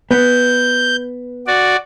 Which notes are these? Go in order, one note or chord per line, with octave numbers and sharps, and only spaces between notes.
B3 G6
F#4 D5